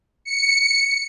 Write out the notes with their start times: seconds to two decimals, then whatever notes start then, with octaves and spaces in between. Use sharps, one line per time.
0.25 C#7